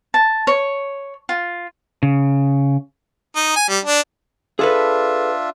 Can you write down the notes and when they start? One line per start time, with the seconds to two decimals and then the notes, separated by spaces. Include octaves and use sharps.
0.14 A5
0.47 C#5
1.29 F4
2.03 C#3
3.36 D#4
3.56 G#5
3.69 G3
3.85 D4
4.59 D4 F4 G#4 A4 B4 E5